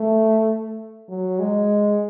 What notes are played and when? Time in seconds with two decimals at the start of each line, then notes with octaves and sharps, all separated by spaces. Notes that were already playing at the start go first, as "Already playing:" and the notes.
Already playing: A3
1.09 F#3
1.39 G#3